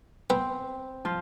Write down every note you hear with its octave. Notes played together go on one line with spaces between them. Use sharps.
B3 C4
F3 F4 F5